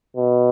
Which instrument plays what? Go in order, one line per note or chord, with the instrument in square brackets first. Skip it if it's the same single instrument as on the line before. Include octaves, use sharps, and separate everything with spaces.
[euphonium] B2